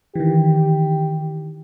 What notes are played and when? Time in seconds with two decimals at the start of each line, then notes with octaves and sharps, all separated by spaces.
0.16 D#3 E3 G4